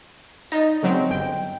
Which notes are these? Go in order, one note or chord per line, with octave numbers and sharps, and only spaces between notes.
D#4 D5 D#5
C#3 F#3 C4
G1 G5